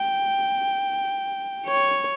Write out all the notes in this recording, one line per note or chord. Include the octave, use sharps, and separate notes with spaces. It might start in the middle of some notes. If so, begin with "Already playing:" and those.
Already playing: G5
C#5